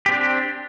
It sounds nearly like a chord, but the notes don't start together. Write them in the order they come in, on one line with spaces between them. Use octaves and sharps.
G4 C4 D4